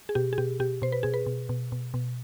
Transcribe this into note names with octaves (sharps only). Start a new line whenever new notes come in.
G#4
B2 G4
G#4
B2 G4
B2 G4
B2 C5
B4
B2 G#4
B4
B2
B2
B2
B2